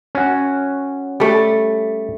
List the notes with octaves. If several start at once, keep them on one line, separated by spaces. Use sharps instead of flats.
C#4 F#4
G3 A3